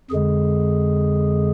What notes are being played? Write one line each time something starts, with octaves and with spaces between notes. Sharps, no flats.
F2 D3 G#3 G#4